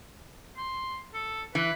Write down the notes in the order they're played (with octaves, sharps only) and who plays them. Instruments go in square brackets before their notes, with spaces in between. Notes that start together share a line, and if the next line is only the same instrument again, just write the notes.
[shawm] C6
A4
[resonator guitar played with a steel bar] E3 [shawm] B4